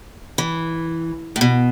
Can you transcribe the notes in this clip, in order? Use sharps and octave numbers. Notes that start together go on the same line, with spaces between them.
E3
A2
B2